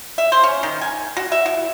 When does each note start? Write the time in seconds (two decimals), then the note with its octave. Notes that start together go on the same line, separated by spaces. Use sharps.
0.18 E5
0.32 C5
0.43 C#4
0.63 D#3
0.81 G#5
1.17 F#4
1.32 E5
1.46 E4